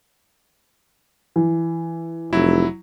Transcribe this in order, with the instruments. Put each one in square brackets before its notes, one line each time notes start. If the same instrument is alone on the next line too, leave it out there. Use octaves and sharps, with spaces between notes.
[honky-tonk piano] E3
[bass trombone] F1 [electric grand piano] F#3 E4